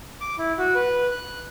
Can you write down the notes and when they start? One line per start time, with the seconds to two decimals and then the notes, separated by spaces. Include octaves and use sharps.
0.21 D6
0.38 E4
0.58 F#4
0.75 B4
1.11 F#6